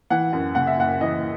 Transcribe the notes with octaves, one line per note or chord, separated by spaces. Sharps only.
E3 F#5
F#2
C#3 F#5
E5
F#1 F#5
E3 D#5